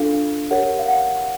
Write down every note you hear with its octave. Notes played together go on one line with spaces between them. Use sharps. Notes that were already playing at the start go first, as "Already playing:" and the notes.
Already playing: D4 F4 A4 F5
G4 A#4 C#5 F#5
F5
F#5